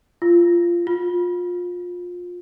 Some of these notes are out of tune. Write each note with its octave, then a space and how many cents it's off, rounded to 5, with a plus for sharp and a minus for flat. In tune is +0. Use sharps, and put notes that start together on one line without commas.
F4 -15
F4 +25